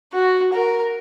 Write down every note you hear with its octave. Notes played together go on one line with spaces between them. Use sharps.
F#4
A#4